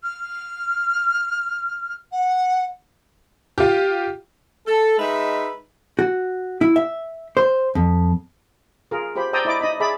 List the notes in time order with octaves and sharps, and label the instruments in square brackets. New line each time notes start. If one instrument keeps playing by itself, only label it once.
[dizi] F6
F#5
[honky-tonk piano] F4 G4
[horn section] A4
G#3 D#4 B4 E5
[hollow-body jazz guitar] F#4
E4
E5
C5
F2
[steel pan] F4 G#4 A#4
F4 G4 C5 B5
C5 D5 G5 A#5 D#6 E6
E4 D5 D#5 D6
D#4 D#5 B5
G#4 D5 E5 B5